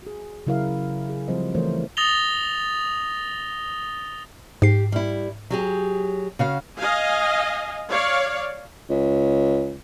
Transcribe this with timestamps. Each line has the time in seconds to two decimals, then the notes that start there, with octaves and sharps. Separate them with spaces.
0.02 F#4 G#4
0.47 C#3 F#3 E4 A#4 F5
1.10 G#4
1.28 F3 G3 A3 C4 C5 D#5
1.54 E3 A3 A#4 C5 C#5
1.97 D#6 A6 A#6 F7 G7
4.62 G#2 G4 C7
4.92 G3 E4
5.50 F#3 G4 G#4
6.39 C#3 F#4 F5
6.77 D#5 F5 G#5
7.89 C#5 D5 F5
8.90 C#2